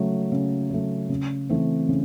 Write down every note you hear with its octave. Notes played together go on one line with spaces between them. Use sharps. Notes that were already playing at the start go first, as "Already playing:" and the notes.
Already playing: C#3 F#3 A3
C#3
F#3 A3
C#3
E3 A3 C4
C#3